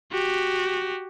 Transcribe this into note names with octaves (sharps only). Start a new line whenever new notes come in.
F#4 G4